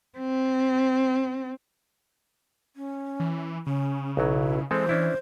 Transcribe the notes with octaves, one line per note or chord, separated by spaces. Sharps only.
C4
C#4
E3
C#3 C#4
B1 F#3 E4
E3 G#3 C4 A4 C5
C#4 D4 E4